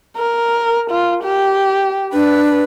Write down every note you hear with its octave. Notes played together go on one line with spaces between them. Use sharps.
A#4
F4
G4
D4 B4